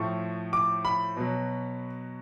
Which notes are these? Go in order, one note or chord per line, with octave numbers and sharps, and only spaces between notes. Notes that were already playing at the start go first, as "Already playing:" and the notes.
Already playing: A2 F3 C#6
D6
B5
B2 F#3